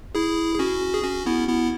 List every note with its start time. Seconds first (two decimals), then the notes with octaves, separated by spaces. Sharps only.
0.15 E4 G#4
0.55 G#4
0.59 C#4 F#4
0.94 G#4
1.04 C#4 F#4
1.26 B3 E4
1.48 B3 E4